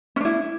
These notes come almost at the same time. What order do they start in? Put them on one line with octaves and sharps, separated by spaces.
C#4 D4 E4